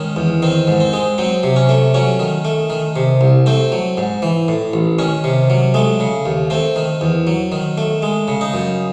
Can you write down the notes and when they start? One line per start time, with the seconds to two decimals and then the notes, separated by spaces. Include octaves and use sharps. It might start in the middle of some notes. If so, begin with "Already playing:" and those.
Already playing: D#3 G#3 C#4
0.16 E2
0.42 D#3 C4
0.67 G#2
0.80 C4
0.93 G#3
1.18 F#3 C4
1.43 C3
1.56 C#4
1.69 A3
1.94 F#3 C#4
2.19 D#3
2.45 A3
2.70 D#3
2.96 C3
3.21 C2
3.46 A3 C4
3.72 F#3
3.97 G#2
4.22 E3
4.48 A2
4.74 A1
4.99 D#3 C#4
5.24 C3
5.50 F#3
5.74 G#3 A3
6.00 C#3
6.25 D#2
6.50 A3 C4
6.76 D#3
7.01 E2
7.27 F#3
7.52 D#3
7.78 A3
8.02 G#3
8.28 C#3
8.41 D#4
8.54 F#2